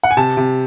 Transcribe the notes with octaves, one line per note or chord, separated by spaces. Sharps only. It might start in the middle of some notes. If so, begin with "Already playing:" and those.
F#5
G#5
C3 A5
C3